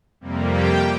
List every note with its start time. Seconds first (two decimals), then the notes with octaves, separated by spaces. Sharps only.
0.21 F2 C3 G3 A#3
0.50 G4 G5